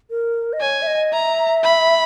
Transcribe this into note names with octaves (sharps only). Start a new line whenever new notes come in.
A#4
D#5
C#5 G#5
E5
D#5
E5 A#5
B5